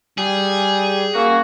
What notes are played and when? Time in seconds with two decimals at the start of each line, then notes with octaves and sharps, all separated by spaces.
0.18 G3 G#4
1.14 A#3 C#4 F#4